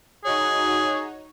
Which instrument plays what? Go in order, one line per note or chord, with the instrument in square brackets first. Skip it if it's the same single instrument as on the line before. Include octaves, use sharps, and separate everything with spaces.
[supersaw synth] D#4 F#4 C#5 [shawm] G#4